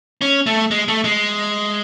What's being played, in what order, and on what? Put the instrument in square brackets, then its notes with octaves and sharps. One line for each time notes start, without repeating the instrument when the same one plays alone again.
[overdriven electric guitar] C#4
A3
G#3
A3
G#3